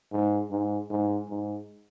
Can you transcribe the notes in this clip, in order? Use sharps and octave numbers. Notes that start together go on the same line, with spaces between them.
G#2
G#2
G#2
G#2